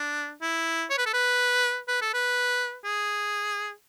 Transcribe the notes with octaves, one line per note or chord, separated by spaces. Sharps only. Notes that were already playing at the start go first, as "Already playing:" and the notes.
Already playing: D4
E4
C#5
B4
A4
B4
B4
A4
B4
G#4